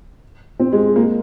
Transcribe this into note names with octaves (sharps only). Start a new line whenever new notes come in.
C4
G#3
A#3